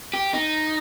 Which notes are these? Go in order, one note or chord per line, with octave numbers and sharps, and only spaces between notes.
G4
D#4